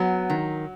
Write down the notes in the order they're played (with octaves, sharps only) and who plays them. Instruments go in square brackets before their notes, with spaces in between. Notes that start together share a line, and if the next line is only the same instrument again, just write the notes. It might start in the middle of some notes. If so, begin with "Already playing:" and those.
Already playing: [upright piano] F#3 [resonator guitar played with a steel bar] B3
[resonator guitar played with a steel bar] D#3